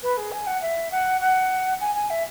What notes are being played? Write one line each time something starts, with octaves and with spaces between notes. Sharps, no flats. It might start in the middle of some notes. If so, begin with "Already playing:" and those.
B4
G#4
G#5
F#5
E5
F#5
F#5
G#5
G#5
E5